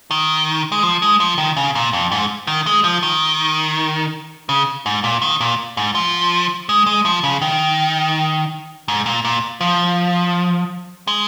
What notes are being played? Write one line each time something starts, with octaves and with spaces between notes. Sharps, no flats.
D#3
G#3
F3
G#3
F3
D#3
C#3
A#2
F2
G#2
D#3
G#3
F3
D#3
C#3
G#2
A#2
D#3
A#2
G#2
F3
G#3
G#3
F3
C#3
D#3
G#2
A#2
A#2
F3
G#3